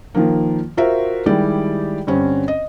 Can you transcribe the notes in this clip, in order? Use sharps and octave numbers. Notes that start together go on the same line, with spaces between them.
D#3 F3 A#3
F4 F#4 A#4 C5 E5
D#3 G3 G#3 E4 G4 D5
G2 D3 C4 C#4
D#5